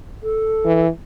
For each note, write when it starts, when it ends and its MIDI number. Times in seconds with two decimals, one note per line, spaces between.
0.23 0.84 69
0.65 0.89 52